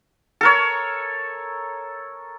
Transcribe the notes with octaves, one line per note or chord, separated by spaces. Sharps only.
A4 A#4 C#5